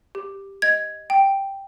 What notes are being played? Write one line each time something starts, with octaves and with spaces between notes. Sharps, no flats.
G4
D#5 G#6
G5